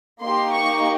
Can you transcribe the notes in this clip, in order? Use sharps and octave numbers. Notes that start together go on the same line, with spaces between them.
A#3 D#4 G4 C6
C#6